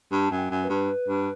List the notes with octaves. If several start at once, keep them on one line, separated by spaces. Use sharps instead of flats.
G2 A5
F#2
G5
F#2
B4
G2
G2